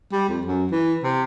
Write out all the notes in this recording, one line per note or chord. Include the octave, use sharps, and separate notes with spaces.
G3
F2
F#2
E3
C3